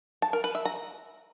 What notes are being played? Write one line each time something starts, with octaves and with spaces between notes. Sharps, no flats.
A5
A#4
B4
E5
A#5